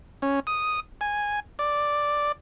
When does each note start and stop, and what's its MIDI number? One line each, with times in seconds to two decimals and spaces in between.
0.22 0.40 61
0.47 0.80 87
1.01 1.40 80
1.59 2.32 74